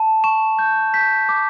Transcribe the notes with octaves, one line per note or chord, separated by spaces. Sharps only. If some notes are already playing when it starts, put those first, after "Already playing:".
Already playing: A5
C#6 E7
G6
G6 B6
D6